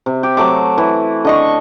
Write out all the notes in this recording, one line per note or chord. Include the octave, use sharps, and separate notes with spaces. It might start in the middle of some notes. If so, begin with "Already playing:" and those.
C3
G4
F#3 A3 D6
E3
D3 D#5 C#6